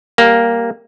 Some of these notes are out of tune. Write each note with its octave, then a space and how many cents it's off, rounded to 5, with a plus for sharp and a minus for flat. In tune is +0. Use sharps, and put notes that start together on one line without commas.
G3 +5 A#3 +0